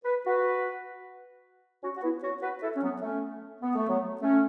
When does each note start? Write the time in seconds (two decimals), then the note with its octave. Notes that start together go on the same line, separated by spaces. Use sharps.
0.05 B4
0.25 F#4 B4
1.83 C#4 F#4
1.97 F#4
2.03 B3 E4
2.23 C#4 F#4
2.42 F#4 B4
2.63 E4 A4
2.77 C#4
2.83 F#3 B3
3.02 A3 C#4
3.61 B3
3.76 A3
3.89 F#3 B3
4.21 A3 C#4